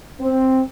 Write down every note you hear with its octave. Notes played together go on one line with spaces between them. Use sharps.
C4